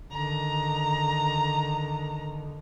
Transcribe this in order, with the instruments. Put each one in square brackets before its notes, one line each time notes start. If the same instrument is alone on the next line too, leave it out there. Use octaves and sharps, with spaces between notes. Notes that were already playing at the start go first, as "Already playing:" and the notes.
[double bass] D3 D#3 [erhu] A#5